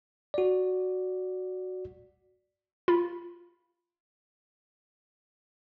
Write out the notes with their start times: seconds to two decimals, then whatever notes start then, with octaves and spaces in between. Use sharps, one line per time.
0.34 F#4 D5
2.88 F4 B5